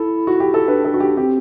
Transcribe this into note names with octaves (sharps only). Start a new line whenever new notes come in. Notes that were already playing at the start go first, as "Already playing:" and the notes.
Already playing: E4 A4
F#4
G4
A4
D4 B4
A4
F#4
G4
C4 G4